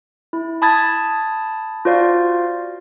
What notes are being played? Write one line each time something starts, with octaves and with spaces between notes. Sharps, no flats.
E4
A5 B5 D#6 G#6 A6
F4 F#4 C5 D5 F5